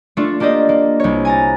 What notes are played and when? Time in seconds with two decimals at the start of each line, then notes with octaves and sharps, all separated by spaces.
0.17 A3 D4 F4 A4
0.40 A#3 D4 G4 D5 D#5
0.69 A#3
1.00 C2 C#5
1.25 G#5 A#5 A6